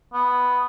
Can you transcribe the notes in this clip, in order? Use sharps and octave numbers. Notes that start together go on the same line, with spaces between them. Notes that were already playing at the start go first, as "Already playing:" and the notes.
B3